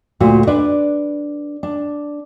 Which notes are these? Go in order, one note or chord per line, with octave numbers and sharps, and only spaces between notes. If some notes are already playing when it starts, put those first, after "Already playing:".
D2 A#2 A3 F#4
D4 B4 D5
D4